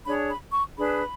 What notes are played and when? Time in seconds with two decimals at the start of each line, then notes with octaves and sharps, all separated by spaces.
0.05 D4 G#4 C#5 B5
0.29 B5
0.53 C#6
0.77 D4 G#4 B4 B5